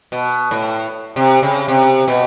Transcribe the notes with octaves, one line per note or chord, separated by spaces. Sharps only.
B2
A2
C3
C#3
C3
B2